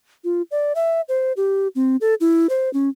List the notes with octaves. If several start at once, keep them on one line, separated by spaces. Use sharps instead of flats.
F4
D5
E5
C5
G4
C4
A4
E4
C5
C#4